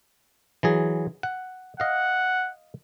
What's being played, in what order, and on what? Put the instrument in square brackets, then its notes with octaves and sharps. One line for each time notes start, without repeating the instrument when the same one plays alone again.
[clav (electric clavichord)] E3 F#3 G#4
F#5
[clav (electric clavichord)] D#5 F5 [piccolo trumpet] F#5